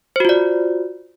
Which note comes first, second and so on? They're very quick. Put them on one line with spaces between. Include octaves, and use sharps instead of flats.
C5 F#4 F4 D5